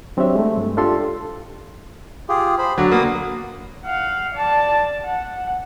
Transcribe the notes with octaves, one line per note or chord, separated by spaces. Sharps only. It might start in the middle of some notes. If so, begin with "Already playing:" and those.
F#3 C4 D4 G4 C#5 E5
G#3 A3
G2
D4 F4 G4 A4 C6
F4 G4 G#4
C5 B5
D3 F#3 D5
A#3 B3 D#6
F5 F#5
D5 A5
F#5